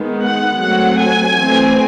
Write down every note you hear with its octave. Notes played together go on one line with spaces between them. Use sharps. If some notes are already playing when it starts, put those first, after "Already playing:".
Already playing: D#3 G#3 B3
F#5
F#3 A3 C4 F#5
G#5
E3 A3 C4